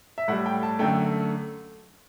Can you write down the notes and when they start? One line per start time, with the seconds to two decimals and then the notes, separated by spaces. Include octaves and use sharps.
0.18 E5
0.28 A2 F#5
0.32 G3
0.46 G5
0.63 A5
0.79 F#2 D3 A3 G5